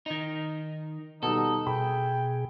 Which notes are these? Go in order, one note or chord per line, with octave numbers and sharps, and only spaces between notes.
D#3 D#4
B2 D#3 G3 D#4 A4
B2 G#4 G5 B5